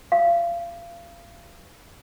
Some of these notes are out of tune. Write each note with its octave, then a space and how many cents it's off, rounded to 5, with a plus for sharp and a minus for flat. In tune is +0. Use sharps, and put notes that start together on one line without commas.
F5 -30